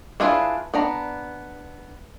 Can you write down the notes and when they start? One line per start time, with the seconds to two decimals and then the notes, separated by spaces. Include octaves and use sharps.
0.20 D4 E4 F4 G#4 B4
0.74 B3 D4 A#5